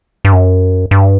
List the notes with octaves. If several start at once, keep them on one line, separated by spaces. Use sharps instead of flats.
G2
F#2
G2